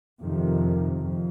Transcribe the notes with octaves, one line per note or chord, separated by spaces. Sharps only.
F2 C3 D#3
F2